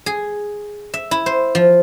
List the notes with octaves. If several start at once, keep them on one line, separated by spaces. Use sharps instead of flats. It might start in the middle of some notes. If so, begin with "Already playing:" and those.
G#4
E5
E4
C5
F3